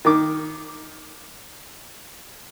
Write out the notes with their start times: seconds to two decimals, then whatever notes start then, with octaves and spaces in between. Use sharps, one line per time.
0.05 D#3 D6